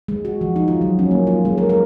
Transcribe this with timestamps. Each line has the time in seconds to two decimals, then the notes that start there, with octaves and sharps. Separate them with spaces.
0.08 G#3
0.25 F#4
0.41 F3
0.56 D#4
0.68 F4
0.81 F#3
0.99 C#4
1.11 A#3
1.27 F4
1.45 G#3
1.58 A#4
1.69 A#4